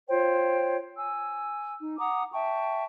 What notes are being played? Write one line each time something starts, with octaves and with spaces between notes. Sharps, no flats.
F4 C5 C#5 G5
G#5 E6
D#4
F#5 A#5 D6 D#6
E5 G5 A5 C#6